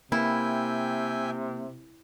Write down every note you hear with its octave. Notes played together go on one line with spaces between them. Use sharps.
C3 A#3 E4 E5 G5 G#5